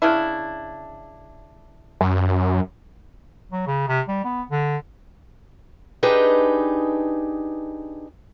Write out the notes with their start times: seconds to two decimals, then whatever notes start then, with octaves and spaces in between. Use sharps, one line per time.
0.02 C#3 D4 E4
2.01 F#2
3.52 F#3
3.67 C#3
3.88 C3
4.08 G3
4.24 B3
4.51 D3
6.03 D4 D#4 G4 G#4 B4